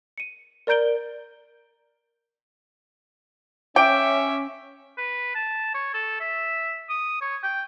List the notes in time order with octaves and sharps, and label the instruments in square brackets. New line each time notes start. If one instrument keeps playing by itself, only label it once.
[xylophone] C#7 D#7
A#4 D5 A#5 G6 D7 G7
[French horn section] C#4 [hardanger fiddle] E5 [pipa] G5 [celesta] D6 D7
[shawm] B4
A5
C#5
A4
E5
D#6
C#5
G5